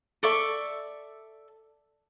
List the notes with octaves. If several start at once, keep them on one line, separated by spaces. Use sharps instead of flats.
A4 D5 E5 C#6